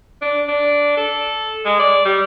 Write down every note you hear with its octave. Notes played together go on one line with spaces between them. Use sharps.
D4
D4
A4
G#3
D5
G3